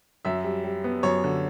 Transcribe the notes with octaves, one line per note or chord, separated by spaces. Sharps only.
F#2 E5
G3
G3
B3
F#2 C#5
D3